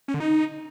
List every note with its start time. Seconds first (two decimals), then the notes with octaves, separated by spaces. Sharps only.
0.08 C#4
0.14 D3
0.20 D#4